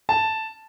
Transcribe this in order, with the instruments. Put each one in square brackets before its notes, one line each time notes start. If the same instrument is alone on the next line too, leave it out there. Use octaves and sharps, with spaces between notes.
[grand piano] A5